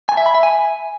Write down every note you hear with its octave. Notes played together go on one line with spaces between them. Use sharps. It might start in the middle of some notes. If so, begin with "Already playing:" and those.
G#5
E5
B5
E5
G#5